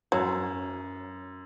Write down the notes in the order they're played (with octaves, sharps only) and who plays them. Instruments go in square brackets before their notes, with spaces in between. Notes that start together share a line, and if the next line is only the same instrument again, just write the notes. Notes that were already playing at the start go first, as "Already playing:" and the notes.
[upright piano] F#2 [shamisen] F#3